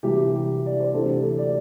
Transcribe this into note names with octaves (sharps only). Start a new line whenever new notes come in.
C2 C3 E3 G4
D5
C5
D2 C3 E3 A4
D5